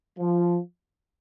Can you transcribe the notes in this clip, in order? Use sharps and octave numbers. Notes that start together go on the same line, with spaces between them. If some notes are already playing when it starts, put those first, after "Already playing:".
F3